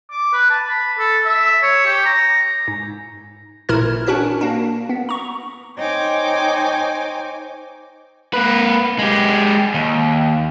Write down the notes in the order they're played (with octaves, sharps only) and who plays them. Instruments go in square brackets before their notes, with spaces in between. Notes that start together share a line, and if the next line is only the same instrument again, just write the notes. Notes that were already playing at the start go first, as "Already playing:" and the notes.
[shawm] D6
B4
A5
B5
A4
E5
C#5
G4
A#5
[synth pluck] G#2
A1 A#2 E4 A#4 F6 G#6
C#4 D4 F#4 A#4 F#6 B6
A#3 D4
B3
A#5 C#6
[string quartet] D#4 C5 C#5 G5 G#5 D6
[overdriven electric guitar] A#3 B4
G#3 G4
D#2